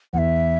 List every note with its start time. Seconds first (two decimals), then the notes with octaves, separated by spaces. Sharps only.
0.13 E2 F#5
0.18 E5